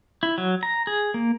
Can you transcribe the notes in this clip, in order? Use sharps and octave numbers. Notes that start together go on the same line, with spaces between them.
E4
F#3
A#5
G#4
A#3